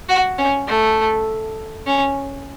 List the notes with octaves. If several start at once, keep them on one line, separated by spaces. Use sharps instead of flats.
F#4
C#4
A3
C#4